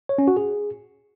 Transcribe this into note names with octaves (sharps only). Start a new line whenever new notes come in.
C#5
C#4
F#4
G#4